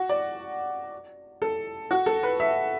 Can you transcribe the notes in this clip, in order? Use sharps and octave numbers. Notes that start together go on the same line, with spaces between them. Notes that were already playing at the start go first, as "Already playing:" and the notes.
Already playing: F#4
D5
A4
F#4
A4
B4
E5